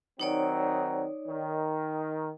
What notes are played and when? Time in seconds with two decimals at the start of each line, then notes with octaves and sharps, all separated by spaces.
0.20 D#3 F#3 C4 D#4 C#5 D5
1.28 D#3